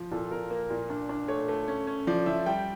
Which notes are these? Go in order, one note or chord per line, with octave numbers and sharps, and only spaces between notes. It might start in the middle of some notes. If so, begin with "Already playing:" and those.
Already playing: F3
A#2 A4
A#2 A#4
A#3
A#2
D4
D4
A3 C#5
A3
C#4
C#4
F3 D5
F3 E5
G3 G5